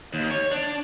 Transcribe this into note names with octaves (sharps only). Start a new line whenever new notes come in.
D#2
C#5
D4